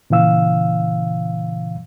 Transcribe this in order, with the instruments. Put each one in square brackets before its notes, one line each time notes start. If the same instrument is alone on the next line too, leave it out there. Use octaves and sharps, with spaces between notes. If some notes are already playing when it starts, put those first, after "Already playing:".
[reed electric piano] A#2 C#3 E3 F5 E6